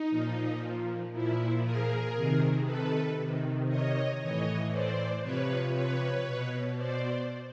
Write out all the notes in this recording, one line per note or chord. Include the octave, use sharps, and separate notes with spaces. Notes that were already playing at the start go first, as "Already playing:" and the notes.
Already playing: D#4
A#2 F3
A#2 F3 E4
G#4 A#4
C3 D#3
A4 B4
C3 D#3
C#5 D#5
A2 E3 C#5 D#5
C5 D5
C3 F3 B4 C#5
B4 C#5
B2
C5 D5